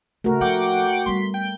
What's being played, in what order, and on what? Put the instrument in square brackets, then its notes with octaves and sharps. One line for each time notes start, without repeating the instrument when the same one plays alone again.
[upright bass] D2 C#3 [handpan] A3 A#4 [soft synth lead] F#4
[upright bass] F3 D4 [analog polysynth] F#5 G5 D6
[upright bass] G3 B3 [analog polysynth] C6 B6
[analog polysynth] G5